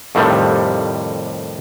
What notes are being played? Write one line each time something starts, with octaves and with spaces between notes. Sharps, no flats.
F2 A2 C3 D#3 G3